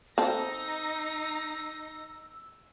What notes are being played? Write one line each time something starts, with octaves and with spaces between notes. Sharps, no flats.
C4 D#4 A4 E6 A#6